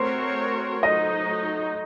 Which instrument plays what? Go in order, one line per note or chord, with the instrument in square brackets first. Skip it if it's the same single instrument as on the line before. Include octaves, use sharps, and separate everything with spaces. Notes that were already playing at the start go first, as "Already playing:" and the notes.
Already playing: [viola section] A3 C4 F#4 A#4 C#5 [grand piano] C5
[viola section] F#3 A3 D#4 [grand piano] D#5